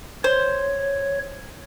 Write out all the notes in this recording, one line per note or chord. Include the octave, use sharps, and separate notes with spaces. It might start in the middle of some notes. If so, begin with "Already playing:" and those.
C5 C#5